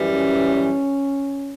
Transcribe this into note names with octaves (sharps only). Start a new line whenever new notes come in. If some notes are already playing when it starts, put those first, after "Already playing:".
Already playing: F#2 E3 G3
C#4